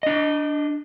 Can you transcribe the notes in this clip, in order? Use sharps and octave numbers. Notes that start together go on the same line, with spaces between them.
D4 D#5